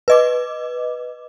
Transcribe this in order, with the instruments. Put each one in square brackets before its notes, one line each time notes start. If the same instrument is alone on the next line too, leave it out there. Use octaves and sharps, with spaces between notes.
[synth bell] B4 D#5 D6